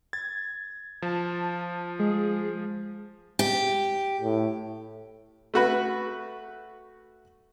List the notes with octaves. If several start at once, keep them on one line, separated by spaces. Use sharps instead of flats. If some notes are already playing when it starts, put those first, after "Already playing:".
G#6 A6
F3 A5
G#3 G#4
G4
A2
A3 F#4 B4